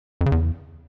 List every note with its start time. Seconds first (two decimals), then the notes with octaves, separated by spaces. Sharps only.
0.21 F2
0.26 C#3
0.32 E2